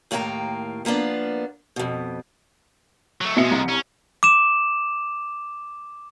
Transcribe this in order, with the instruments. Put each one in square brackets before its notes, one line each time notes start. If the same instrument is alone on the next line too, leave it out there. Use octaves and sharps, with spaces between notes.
[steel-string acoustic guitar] D#2 A2 A#3 G5 A#5
F3 A#3 B3 D4
F2 B2
[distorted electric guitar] F#3 A3
[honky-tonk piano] B2 E5 C#7 [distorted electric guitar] F3 G#3
[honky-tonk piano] C2
[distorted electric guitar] C#4
[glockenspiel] D6 E7